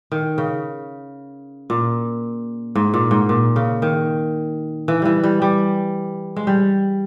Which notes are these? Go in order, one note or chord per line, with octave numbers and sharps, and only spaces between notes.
D#3
C#3
A#2
G#2
A#2
G#2
A#2
C#3
D#3
E3
E3 G3
G3
G3
G#3
G3